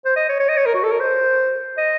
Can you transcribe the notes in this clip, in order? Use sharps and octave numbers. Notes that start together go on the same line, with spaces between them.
C5
D#5
C#5
C#5
D#5
C#5
A#4
F#4
A4
A#4
C5
D#5